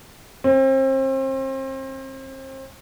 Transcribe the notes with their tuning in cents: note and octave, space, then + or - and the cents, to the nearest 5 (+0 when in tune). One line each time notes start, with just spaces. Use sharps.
C4 +35